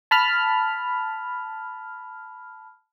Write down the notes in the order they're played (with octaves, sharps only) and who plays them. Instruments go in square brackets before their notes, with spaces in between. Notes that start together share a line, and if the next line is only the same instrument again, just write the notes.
[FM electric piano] A5 B5 F6